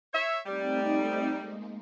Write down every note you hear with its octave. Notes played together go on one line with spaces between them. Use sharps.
C#5 E5
G3 A3 C4 D#4
G#3 A#3